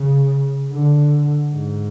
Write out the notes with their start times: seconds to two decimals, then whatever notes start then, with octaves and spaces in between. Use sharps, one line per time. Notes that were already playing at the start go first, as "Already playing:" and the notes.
Already playing: C#3
0.73 D3
1.51 G#2